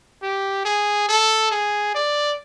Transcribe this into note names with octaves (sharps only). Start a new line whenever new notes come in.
G4
G#4
A4
G#4
D5